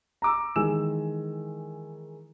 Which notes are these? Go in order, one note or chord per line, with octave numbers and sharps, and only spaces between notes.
A#5 D6 E6
D#3 E3 G#3 G#5 E6 E7